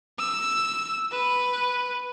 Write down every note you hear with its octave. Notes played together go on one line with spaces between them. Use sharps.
E6
B4